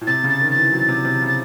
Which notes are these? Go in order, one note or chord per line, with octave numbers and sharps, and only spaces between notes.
A2
C3 A6
C#3
A6
D#3
E3 A6
F#3
C3
C3
C#3
A6